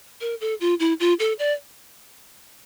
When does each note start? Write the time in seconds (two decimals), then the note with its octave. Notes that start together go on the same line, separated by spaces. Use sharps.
0.21 A#4
0.41 A4
0.61 F4
0.80 E4
1.00 F4
1.19 A4
1.39 D5